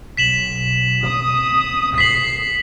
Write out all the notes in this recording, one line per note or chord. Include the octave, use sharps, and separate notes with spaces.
B1 B6 E7 F#7
D#6
B6 C7 F#7